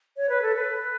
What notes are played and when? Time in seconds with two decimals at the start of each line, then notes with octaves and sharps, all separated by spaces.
0.17 C#5
0.29 B4
0.42 A4
0.55 B4